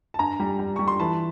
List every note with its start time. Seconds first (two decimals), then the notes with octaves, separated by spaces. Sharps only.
0.14 A5
0.19 G2 G#5 A#5
0.40 G3
0.59 G3
0.76 G3 C#6
0.88 C6
1.00 E3 A5 B5